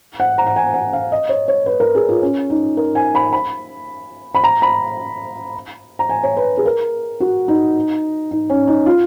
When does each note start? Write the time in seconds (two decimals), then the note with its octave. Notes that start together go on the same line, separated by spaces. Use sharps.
0.20 F#5
0.38 A#5
0.47 F#5
0.56 G#5
0.74 F#5
0.93 F5
1.12 D#5
1.29 C#5
1.48 C#5
1.66 B4
1.80 A#4
1.95 G#4
2.09 F4
2.22 C#4
2.50 D#4
2.77 A#4
2.95 G#5
3.15 B5
3.33 B5
4.35 B5
4.44 A#5
4.62 B5
5.99 A#5
6.10 G#5
6.23 C#5
6.37 B4
6.57 G#4
6.66 A#4
7.20 F#4
7.48 D#4
8.31 D#4
8.50 C#4
8.67 D#4
8.86 F4